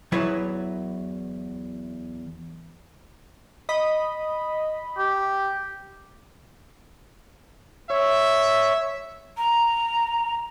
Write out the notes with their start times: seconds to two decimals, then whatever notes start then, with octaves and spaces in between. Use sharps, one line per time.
0.12 E2 F#3 E4 B4 C#5
3.69 D#5 B5
4.98 G4
7.90 C#5 E5
9.37 A#5